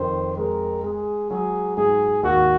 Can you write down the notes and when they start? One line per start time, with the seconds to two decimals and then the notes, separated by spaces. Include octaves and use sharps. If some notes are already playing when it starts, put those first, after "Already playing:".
Already playing: F2 D#3 C5
0.37 G#3 A#4
0.83 G#3 G#4
1.30 F#3 G#4
1.77 G#2 G#4
2.23 D#2 F#4